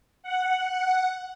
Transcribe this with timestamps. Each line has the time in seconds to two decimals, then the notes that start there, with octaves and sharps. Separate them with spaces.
0.23 F#5
0.66 F#5